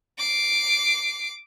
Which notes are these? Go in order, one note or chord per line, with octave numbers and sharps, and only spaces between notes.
D6 C7